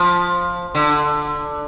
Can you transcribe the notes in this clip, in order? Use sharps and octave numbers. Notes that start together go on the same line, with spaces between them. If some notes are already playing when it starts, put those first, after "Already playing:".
Already playing: F3
D3